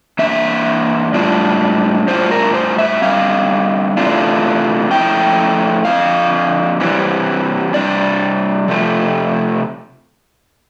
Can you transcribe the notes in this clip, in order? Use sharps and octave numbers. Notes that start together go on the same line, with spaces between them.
E3 A#3 D4 E5
A2 G3 D4 F4
A2 G3 D4 F4 C5
A#4
C5
E5
D3 G3 C4 F5
C3 E3 A3 D4 F4
F3 A3 E4 G5
D3 F3 C4 F5
C3 E3 G3 C4
C3 G3 D4 D5
C3 F3 A3